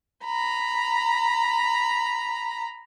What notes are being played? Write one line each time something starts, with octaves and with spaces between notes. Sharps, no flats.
A#5 B5